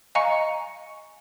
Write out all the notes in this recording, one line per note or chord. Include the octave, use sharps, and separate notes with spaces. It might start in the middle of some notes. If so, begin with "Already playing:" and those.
D#5 F5 G#5 A#5 C#6 C#7